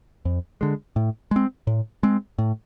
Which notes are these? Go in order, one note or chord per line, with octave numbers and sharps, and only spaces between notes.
F2
D3 G#3
A2
G#3 C4
A2
G#3 C4
A2